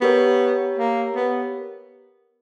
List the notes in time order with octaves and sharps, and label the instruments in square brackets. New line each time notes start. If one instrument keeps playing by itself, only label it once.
[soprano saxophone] B3 [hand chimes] G4 A#4 C#5
[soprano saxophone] A#3
B3